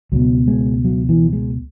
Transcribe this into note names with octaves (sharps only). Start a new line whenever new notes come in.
C#2 B2 F#3
G#3
F#3
E3
G#3